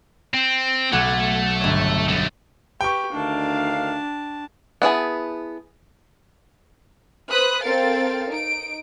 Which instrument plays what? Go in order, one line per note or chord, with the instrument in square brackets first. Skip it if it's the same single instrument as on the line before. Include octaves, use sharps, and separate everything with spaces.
[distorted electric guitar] C4
[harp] B1 F#5 G#6 [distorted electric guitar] A3
[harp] G1 C#5
[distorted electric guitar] B1 A3
[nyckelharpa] G4 B4 [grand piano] G5 C#6
[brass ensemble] D2 D#3 F5 [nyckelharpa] D4 A5
[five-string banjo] B3 E4 G#4 A5
[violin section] B4 C5 B5 D#6 F#6
C4 A4 A#4 F5 A6 D7
D#4 D7